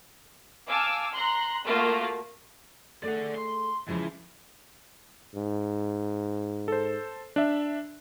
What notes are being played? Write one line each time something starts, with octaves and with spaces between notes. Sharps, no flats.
F5 G#5 A5 D6 E6 F6
A#5 C6 F#6
A3 A#3 F4 F#4 F5
A3 G#4 D5 F#5
C6
C#3 E3 F3 G#3
G#2
A4 C5
D4 E5